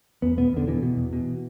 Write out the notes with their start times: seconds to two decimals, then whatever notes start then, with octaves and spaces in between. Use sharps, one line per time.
0.22 E2 B3
0.37 B2 B3
0.53 E2 D3
0.67 B2 E3
0.83 B2
0.97 E2
1.13 B2